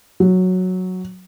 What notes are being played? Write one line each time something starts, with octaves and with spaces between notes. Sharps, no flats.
F#3